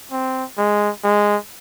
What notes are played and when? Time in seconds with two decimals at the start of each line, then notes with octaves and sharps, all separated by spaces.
0.12 C4
0.58 G#3
1.04 G#3